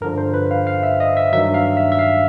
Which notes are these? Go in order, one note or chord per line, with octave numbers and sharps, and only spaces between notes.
G2 D3 F3 A#4
C5
B4
F5
F5
E5
D#5
E5
G2 D#3 F#3 E5
F5
E5
E5
F5